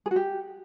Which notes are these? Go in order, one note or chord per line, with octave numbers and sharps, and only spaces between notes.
G#4
F#4
G4